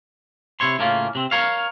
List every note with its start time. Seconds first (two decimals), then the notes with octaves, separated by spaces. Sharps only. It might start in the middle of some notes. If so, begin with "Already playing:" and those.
0.60 C3 E4 C#5 C6
0.79 A2 C#3 A#3 C#4 F4
1.15 C3 C4
1.31 A#4 C#5 F5